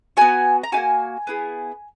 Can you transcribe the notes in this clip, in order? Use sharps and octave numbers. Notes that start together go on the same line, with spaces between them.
B3 F#4 G#5
A#5
A#3 D#4 F#4 G#5
B3 E4 G#4